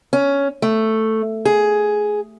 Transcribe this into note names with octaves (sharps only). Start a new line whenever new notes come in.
C#4
A3
G#4